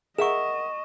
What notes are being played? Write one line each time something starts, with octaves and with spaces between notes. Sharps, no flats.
G#4 A#4 D#5 E5 F#5 C#6 E7